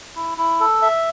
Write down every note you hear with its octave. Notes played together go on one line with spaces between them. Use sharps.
E4
E4
A4
E5